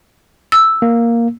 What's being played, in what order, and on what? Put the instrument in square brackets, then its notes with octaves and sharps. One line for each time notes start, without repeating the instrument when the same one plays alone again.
[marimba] E6
[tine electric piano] A#3